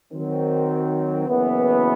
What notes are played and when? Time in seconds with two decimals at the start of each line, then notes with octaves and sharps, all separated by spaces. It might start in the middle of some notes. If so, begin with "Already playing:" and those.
0.11 D#3 F#3 C4
1.27 F#1 F#2 E3 B3